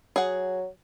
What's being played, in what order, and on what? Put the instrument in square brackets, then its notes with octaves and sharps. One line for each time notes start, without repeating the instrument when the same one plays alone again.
[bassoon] F#3 [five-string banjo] G#4 F#5